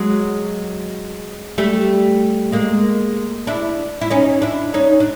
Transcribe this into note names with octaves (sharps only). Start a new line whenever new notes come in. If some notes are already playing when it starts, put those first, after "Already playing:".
Already playing: F#3 G#3
G3 A3
G#3 A#3
D4 E4
E4
C#4 D#4
D4 E4
C#4 D#4
D4